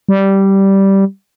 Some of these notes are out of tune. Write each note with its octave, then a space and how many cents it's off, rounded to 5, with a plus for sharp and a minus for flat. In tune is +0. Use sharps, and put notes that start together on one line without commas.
G3 -10